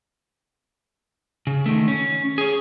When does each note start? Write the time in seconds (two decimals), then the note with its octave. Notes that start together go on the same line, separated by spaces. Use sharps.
1.47 C#3
1.66 D#3 A3
1.88 C#4
2.38 G#4 C#5